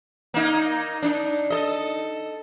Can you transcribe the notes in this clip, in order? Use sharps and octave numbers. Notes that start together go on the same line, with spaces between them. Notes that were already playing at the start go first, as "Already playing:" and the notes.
A#3 D#4
D4 D#4
A4 D#5